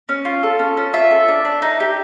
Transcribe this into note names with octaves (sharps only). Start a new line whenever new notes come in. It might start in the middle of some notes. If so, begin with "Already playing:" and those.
C#4
F4
A4
C#4
C#4
F4 E5
A4
D4
D4
D#4
G4